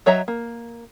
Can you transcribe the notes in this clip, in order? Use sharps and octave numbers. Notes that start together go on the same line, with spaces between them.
F#3 C#5 D#5 E5 A#5
A#3